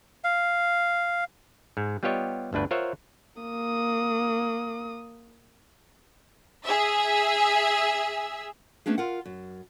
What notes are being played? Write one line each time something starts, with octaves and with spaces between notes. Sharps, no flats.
F5
G#2
G3 B3 F4 G4 C#5 D#5
G1 D2 D4 B4
F4 A#4 C5 C#5 E5 F#5
A#3 D#6
G#4 E5
A3 B3 C#4 D4 G#4
F4 A#4 F#5
F#2